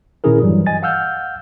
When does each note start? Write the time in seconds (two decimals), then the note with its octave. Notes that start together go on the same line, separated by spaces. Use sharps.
0.24 A#2 D#3 C#4 E4 G#4 A#4
0.42 G2 E3 F#3 G3
0.66 D#5 G#5 A6
0.83 F5 F#5 E6 F6 G6